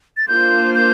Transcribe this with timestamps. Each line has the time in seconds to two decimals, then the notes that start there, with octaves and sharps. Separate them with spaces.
0.17 A6
0.28 A#3 D4 F4 C5 G6
0.75 G6